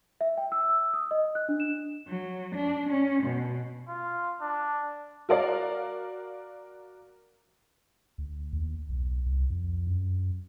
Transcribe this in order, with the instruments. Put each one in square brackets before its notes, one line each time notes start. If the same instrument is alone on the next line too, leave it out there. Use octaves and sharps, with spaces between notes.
[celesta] E5
G5
E6
E6
D#6
D#5
F#6
D4
E7
[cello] F#3
D4
C#4
B2
[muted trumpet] F4
D4
[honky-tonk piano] F#4 A#4 D5 F5
[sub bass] D2
D#2
B1
C2
F2
F#2